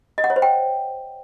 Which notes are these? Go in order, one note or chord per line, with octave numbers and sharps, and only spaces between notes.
D#5
F#5
C#5
C5
G5